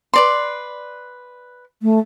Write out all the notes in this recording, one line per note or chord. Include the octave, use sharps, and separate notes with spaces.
B4 D5 C6
A3